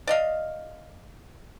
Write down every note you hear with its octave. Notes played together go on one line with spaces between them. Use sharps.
D5 D#5 F5